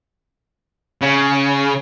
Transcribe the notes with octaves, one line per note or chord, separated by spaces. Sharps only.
C#3